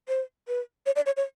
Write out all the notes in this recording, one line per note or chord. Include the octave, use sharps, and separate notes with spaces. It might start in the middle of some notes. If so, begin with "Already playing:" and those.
C5
B4
C#5
D5
C#5
C#5